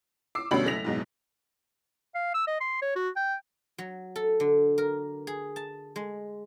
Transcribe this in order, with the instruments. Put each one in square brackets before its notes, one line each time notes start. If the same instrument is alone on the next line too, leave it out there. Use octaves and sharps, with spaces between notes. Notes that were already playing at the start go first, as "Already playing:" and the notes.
[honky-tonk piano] D6 E6 C7
D2 B2 G3 C#4 B5 F#7
F#1 A3 A#6 B6 F7
F#1 G#2 B2
[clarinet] F5
E6
D#5
C6
C#5
F#4
G5
[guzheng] F#3
A4
D3
A#4
G#4
A5
G#3